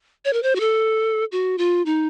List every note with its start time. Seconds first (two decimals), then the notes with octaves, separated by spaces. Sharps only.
0.25 C#5
0.33 A#4
0.43 C5
0.56 F#4
0.60 A4
1.32 F#4
1.58 F4
1.86 D#4